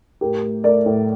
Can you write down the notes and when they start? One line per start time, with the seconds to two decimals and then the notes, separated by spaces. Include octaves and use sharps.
0.21 A2 G4 A#4
0.43 A3
0.64 A3 A#4 D5
0.86 A2